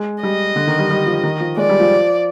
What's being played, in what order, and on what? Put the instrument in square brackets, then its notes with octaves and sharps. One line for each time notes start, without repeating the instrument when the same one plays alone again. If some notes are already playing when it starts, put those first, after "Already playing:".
Already playing: [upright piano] G#3
[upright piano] G3 [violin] D#5
[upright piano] D3
D#3
G3
G3
F3
D#3
F3
[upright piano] G#3 [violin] D5
[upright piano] G3
F3